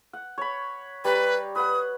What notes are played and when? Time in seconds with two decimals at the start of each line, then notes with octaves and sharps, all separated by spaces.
0.13 F#5
0.38 C#5 B5
1.05 G3 G4 B4 A#5
1.56 B4 F#5 D#6